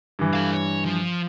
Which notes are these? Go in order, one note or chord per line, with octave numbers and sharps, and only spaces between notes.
G2 E3
A4 F5
C#5
F3